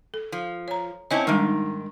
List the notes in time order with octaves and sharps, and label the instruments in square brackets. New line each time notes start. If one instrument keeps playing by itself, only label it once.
[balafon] A4
[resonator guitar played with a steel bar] F3
[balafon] C#5 A#5
[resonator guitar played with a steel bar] C4 C#4 E4 [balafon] D#5 A5
[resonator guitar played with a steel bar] G#2 D#3 [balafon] G3 G#3 D4